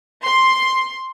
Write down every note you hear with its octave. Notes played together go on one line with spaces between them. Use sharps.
C6